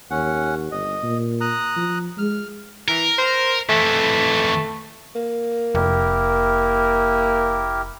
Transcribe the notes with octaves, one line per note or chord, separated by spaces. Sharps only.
D#2 C#4 F#5
G1 D#5
A#2
A#5 D#6 F#6
F3
G#3 F6
E3 A#4
C5
F2 E3 A3
A#3
F1 E4 G4 A#4